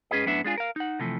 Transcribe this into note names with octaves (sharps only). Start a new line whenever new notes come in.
G#2 C#4 G#4 B4 D#5
F#2 A2 B3 D4 E5
G#3 D4 F4 G#4
A#4 F5
D#4 F#5
C3 E3 F3 A3